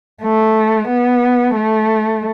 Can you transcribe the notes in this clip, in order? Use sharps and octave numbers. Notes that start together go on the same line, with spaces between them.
A3
B3
A3